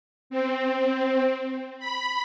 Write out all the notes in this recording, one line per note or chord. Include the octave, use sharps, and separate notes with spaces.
C4
B5